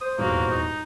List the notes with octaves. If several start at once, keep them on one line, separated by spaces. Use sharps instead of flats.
C5 D#6
D#1 E2 G#2 A#3 F#4
D#4